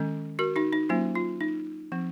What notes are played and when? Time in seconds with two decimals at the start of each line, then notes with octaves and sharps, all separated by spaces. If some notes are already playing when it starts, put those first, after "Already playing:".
Already playing: D#3 G#3 C#4
0.39 F#4 A#4
0.56 D#4 F#4
0.73 D#4
0.89 F#3 A#3 C#4 F4
1.15 F4
1.41 D#4
1.92 F3 C4